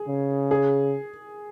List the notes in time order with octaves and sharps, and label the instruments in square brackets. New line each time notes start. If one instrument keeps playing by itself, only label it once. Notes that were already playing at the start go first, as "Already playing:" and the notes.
Already playing: [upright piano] G#4
[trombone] C#3
[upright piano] G#4